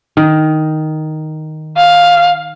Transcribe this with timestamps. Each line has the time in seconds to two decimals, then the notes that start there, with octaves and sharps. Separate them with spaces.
0.17 D#3
1.77 F5